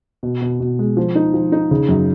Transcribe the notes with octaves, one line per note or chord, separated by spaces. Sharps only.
B2
B2
B2
G#3
F3
D#4
F3
D#4
C#3
F#2